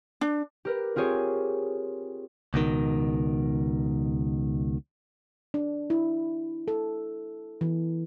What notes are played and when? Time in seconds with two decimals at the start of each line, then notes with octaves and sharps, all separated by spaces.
0.21 D4
0.65 G4 A#4 B4
0.96 C4 F4 G4 G#4 C#5
2.54 C#2 B2 D#3
5.54 D4
5.90 E4
6.68 A4
7.61 E3